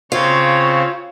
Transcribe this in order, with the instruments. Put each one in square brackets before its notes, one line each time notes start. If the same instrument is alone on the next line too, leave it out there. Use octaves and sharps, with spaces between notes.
[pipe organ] C#3 C4 [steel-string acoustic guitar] F4 [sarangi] C#5